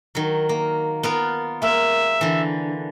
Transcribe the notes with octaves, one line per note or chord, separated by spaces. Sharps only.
D#3 F#3
A#3
B3 F4 A#4
G#3 A#3 E5
D3 E3